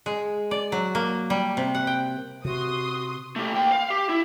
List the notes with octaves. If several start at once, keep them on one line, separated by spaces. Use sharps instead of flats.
G#3
D5
F#3
A#3
G3
C3
F#5
G5
C3 F#4 C6 D#6
A3 G4
D#2 G5
F5
G4
E4